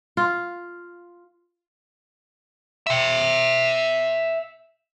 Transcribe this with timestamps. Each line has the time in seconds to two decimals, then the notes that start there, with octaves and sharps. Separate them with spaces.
0.17 F4
2.87 E5 G5